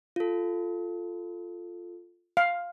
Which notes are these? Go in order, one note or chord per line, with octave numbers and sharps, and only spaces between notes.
F4 A4
F5